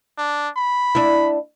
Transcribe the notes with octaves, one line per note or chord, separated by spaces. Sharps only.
D4
B5
D4 E4